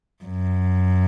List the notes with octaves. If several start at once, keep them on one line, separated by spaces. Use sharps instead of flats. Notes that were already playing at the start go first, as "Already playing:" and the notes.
F#2